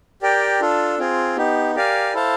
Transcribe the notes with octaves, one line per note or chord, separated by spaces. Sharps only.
G4 A#4 D5 G5
D4 F4 A4
C4 F4 G#4
B3 D#4 G4
G4 A#4 D5 F5 G#5
E4 A4 C5 F5 A5